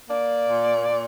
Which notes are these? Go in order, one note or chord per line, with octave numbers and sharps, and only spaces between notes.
A#3 D5
A#2
A#2